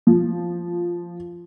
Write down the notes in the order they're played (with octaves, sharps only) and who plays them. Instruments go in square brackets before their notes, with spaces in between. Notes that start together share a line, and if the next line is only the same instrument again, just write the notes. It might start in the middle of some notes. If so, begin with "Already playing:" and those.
[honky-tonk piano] F3